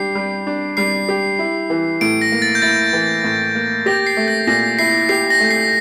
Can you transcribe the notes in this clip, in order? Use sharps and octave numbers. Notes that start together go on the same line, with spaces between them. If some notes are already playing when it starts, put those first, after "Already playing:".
Already playing: G3 D4 G4 C7
G3
D4
G3 C7
G4
E4
E3
A2 D7
A#6
A#3
A6
G6
E4 A6
E3
A2
A#3
G4 A#6
C7
A3
A#6
A#2 A#6
E4 C7
G4 C7
A#6
A3
C7